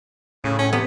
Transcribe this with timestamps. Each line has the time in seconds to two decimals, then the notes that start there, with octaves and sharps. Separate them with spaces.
0.44 A2 C#3
0.59 C#4
0.73 C3 B3